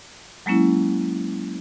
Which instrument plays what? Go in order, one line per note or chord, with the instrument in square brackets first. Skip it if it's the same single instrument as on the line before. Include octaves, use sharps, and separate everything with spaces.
[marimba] F#3 G#3 A#3 C#4 E4